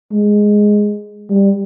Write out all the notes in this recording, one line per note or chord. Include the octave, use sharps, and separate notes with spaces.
G#3
G3